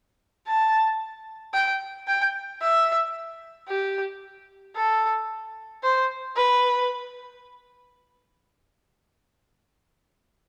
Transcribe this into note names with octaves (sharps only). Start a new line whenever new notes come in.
A5
G5
G5
E5
G4
A4
C5
B4